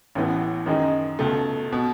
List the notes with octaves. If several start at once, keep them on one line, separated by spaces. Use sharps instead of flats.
A1 A2 E3 B3
F#2 D#3 G#3 D#4 G#4
C#2 B2 A3
B2